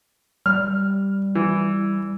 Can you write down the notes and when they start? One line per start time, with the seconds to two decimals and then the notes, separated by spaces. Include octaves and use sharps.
0.46 G3 F6
1.35 E3